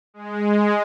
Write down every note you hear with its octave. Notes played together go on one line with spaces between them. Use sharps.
G#3